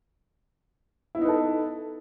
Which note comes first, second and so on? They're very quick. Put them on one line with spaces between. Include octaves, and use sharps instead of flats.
E4 B3 D#4 B4 A4